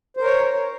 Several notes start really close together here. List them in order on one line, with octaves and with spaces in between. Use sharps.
C5 A#4 C#5